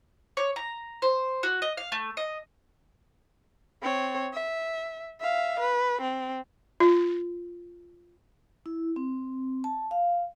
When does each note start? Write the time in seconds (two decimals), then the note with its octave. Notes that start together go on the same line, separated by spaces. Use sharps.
0.37 C#5
0.56 A#5
1.02 C5
1.43 F#4
1.62 D#5
1.77 F5
1.92 A3
2.17 D#5
3.82 C4 C#5
4.33 E5
5.20 E5 F5
5.59 B4
6.01 C4
6.80 F4
8.66 E4
8.96 C4
9.64 A5
9.91 F5